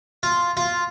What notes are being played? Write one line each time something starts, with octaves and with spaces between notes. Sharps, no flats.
F4
F4